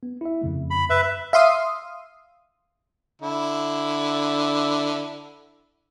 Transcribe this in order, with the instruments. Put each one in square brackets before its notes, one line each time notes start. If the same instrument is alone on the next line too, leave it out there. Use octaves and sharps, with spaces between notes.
[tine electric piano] B3
E4 E5
F2 C#3 A3
[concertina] B5
[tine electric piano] F#2 [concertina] B4 E5
[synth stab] E5 F5 C6 D#6
[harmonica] D3 E4